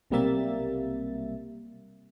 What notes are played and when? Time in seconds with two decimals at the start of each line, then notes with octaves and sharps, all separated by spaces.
0.10 B1 C3 G3 A#3 E5 A6